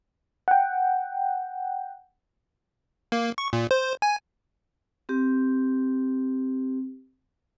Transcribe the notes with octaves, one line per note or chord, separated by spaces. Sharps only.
F#5 G5
A#3
C#6
A#2
C5
G#5
C4 G4